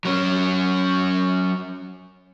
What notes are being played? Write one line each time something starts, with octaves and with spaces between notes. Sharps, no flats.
F#3 C#4